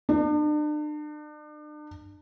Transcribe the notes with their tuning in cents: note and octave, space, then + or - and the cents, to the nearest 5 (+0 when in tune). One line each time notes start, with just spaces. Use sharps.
D4 +40